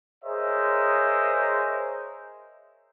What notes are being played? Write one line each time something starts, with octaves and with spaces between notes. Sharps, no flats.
G#4 A#4 C5 C#5 D#5 E5